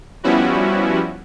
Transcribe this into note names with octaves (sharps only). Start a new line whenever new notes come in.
F3 G3 B3 C#4 E4 F#4